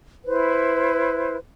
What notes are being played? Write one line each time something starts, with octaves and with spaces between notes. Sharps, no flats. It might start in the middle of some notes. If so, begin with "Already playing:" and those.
E4 B4 C5